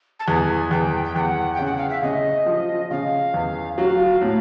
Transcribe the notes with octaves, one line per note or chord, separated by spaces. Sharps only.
A5
E2 G#5
E2 G5
G5
E2 F#5 G5
C#3 G5
F#5
F5
E5
C#3 D#5
F3
C#3 F5
E2
F#3 F5
A2